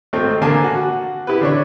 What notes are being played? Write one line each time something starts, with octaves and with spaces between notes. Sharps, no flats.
G#1 A3 C4 G5
D3 A#3 G#5 A5
F#4
E4 G4 B4
D3 D4 C#5